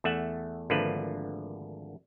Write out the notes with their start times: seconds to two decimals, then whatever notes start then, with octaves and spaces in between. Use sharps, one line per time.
0.04 E2 A3 E5 F#5 A5
0.70 G#1 D3 F3 A3 A#3 B4